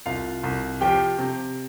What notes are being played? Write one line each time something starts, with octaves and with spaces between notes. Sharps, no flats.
C2 F4 F5
C2
F3 G4 G5
C3